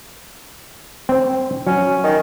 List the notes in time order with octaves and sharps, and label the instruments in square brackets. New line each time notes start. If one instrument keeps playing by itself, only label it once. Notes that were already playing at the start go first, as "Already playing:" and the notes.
[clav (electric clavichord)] C4 C5
[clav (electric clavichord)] F#3 [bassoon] C#4
[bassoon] D#3